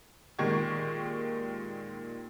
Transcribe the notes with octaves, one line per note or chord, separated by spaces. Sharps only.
A#2 D#3 G#3 G4 C#6 G#6